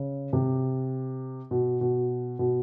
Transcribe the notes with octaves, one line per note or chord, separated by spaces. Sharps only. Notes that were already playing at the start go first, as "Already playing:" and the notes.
Already playing: C#3
C3
B2
B2
B2